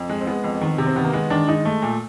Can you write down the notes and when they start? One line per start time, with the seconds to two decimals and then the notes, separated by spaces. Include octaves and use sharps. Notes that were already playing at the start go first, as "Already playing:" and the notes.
Already playing: F2
0.09 G#3
0.21 C4
0.26 G#3 B3
0.44 F2
0.61 D#3
0.78 C3
0.86 C4
0.96 D#3 B3
1.04 A#3
1.13 G#3 B3
1.30 D#3 D4
1.48 G#3 D#4
1.65 A3
1.82 A#2